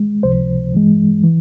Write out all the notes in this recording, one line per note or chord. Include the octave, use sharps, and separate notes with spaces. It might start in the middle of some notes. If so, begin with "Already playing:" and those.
Already playing: G#3
C#2 C3 F3 C5
G2 E3 G#3
E3